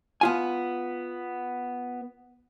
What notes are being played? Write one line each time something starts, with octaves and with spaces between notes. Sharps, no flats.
B3 F4 G#5